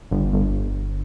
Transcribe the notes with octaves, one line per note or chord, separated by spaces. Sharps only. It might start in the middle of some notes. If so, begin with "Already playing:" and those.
G1
G1